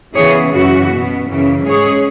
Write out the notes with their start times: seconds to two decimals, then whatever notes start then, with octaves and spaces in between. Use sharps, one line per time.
0.15 C#3 E3 B3 G#4 C#5
0.53 F#2 C#3 E3 C#4 F#4
0.91 B2 B3
1.28 F#2 C#3 E3 C#4
1.65 G#2 G#3 C#4 G#4 C#5